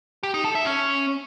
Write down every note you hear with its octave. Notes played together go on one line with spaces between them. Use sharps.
G4
D#4
A4
E5
C#4